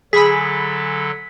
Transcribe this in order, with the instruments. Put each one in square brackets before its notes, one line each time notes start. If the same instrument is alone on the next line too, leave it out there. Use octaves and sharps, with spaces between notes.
[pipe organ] D3 F#3 A4 [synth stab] G#4 B5 [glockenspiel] B6